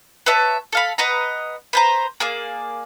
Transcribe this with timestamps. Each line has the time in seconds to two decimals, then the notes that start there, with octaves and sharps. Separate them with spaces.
0.26 B4 C#5 E5 A5
0.73 A4 F5 B5
0.98 B4 D#5 F#5 A#5
1.73 B4 C5 A#5
2.20 A#3 G#4 D5